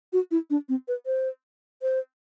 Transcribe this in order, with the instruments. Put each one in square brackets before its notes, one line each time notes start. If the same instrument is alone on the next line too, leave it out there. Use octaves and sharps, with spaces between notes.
[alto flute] F#4
E4
D4
C4
B4
C5
C5